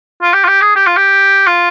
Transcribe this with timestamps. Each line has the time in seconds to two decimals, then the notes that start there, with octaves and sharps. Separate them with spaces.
0.22 F4
0.34 G4
0.44 F4
0.48 G4
0.61 G#4
0.76 G4
0.87 F4
0.97 G4
1.47 F4